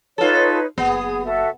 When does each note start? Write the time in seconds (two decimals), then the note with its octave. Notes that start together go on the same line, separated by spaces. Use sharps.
0.18 D#4 F4 A4 B4 C#5
0.78 F#1 B3 G#4
1.25 F#4 A4 E5